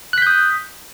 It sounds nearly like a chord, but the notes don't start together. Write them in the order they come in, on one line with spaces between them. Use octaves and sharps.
F#6 B6 G6 D#6